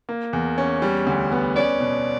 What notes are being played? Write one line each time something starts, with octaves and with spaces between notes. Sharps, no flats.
A#3
E2
C#4
G3
D2
B3
C#4 D5
B2